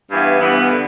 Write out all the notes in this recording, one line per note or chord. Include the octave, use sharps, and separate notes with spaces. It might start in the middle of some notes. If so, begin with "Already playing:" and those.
G2 E3 B3
G2 E3 B3
D3